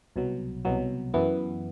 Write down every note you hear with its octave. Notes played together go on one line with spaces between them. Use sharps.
C2 B2 F#3
C2 B2 F#3
F#2 E3 B3